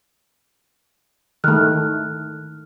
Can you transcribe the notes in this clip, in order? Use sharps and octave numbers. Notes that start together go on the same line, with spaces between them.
D#3 A3 F6 F#6